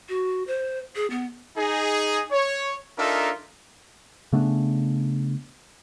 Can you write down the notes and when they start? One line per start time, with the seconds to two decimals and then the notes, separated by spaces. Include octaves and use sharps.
0.09 F#4
0.47 C5
0.96 G#4
1.10 B3
1.57 D#4 G#4
2.32 C#5
2.98 D4 D#4 F4 A4 A#4 E5
4.33 C#3 A3 B3 D4